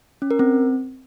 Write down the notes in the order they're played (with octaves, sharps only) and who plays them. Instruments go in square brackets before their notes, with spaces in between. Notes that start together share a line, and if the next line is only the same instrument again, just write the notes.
[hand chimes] C#4
A#4
C4